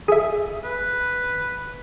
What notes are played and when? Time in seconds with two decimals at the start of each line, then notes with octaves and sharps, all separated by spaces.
0.08 G#4 E5
0.64 B4